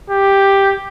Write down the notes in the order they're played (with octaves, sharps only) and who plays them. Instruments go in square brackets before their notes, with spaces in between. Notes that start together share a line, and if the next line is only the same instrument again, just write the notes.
[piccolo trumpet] G4